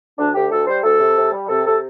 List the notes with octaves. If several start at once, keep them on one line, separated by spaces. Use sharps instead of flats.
D2 D4
D2 G4
D2 A4
G3 C5
D2 A4
C3
C3
G3
C3 A4
C3 A4